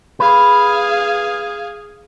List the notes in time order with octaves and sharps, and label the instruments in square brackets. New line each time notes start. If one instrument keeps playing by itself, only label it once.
[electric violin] G#4 F5 [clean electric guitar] B4